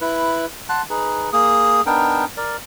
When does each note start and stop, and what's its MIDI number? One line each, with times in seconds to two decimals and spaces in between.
0.01 0.45 64
0.01 0.45 71
0.69 0.82 78
0.69 0.82 81
0.69 0.82 84
0.69 0.82 90
0.90 1.30 63
0.90 1.30 68
0.90 1.30 71
1.33 1.81 58
1.33 1.81 68
1.33 1.81 87
1.86 2.25 59
1.86 2.25 62
1.86 2.25 63
1.86 2.25 70
1.86 2.25 79
2.37 2.57 70
2.37 2.57 74